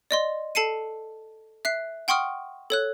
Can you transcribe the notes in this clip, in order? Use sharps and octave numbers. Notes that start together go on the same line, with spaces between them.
D5 D#5 C6
A4 A5 C7 C#7 D#7
E5 F#6 C7
F#5 G5 C6 C#6 D#6 F6
A4 C#5 F#6